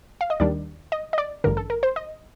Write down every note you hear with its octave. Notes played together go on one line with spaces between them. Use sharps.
F5
D#5
D#2 D#3 G3 D4 D5
D#5
D#5
D5
A1 G2 D3 A#4
A4
A#4
C5
D#5